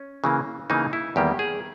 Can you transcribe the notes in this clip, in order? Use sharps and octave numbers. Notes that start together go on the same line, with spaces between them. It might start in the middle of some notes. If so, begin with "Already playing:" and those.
Already playing: C#4
C#3 E3 A#3
C#3 E3 A#3 D#4
E4
E2 D#3 G3 A#3 G4
G#4